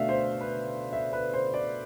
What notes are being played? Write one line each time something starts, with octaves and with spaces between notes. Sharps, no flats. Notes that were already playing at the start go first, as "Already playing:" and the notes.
Already playing: B2 A3 D4 E5 F5
C5
B4
E5
B4
C5
D5